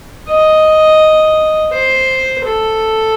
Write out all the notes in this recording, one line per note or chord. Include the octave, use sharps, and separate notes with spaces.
D#5
C5
A4